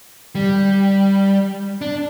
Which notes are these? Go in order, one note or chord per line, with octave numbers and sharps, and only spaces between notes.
G3
D4